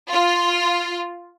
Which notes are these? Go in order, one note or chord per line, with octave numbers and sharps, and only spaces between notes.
F4